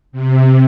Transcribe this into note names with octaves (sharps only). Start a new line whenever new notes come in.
C3